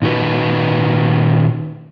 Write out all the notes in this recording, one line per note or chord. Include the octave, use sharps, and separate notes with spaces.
A#2 D#3 F#4 B4